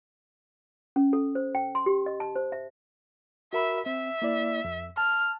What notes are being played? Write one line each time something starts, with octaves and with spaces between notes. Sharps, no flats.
C#4
A4
C5
G5
C6
G4
D#5
A5
C5
E5
F#4 A#4 E5 B5
C4 E5
A#3 E4 D5
F2
A5 F6